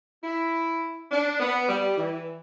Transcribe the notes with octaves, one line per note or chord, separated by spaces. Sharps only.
E4
D4
B3
G3
E3